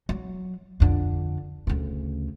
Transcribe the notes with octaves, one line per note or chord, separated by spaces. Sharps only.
F#3
F2 D3
D2 C#3